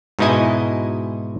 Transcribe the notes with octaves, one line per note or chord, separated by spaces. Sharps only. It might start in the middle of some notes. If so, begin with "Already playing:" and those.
G#2 B2 D#4 E4 D#5 G#5